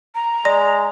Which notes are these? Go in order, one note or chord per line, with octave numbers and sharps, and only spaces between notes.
A#5
G#3 D5